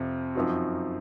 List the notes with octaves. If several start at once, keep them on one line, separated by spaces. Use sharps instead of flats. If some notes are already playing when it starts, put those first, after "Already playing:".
Already playing: F2 C3 F3 C4
F#2 F3 C4 D#4 F#4